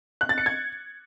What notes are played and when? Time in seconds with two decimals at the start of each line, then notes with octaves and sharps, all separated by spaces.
0.21 F#6
0.29 A6
0.38 C#7
0.46 G#6